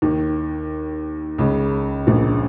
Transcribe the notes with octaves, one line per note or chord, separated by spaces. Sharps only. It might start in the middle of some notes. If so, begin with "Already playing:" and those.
D#2 D#3
C#2 C#3
A#1 A#2